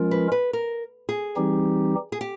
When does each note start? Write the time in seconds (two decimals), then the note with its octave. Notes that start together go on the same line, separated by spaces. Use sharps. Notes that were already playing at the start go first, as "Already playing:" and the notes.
Already playing: F3 G#3 C#4 F4 A#4
0.11 B4
0.32 B4
0.53 A#4
1.09 G#4
1.36 E3 G3 C4 D#4 G4
2.12 G#4
2.21 G4